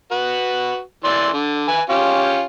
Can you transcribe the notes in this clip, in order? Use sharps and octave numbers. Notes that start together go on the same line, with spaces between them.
F#4 B4
E3 D5 C6
D3
B4 G#5
C#4 F4 G4